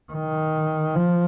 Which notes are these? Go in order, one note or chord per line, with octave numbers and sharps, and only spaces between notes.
D#3
F3